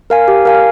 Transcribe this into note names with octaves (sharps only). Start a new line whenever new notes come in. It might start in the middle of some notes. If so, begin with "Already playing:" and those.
A#4 F5 G#5
G4
A#4 F5 G#5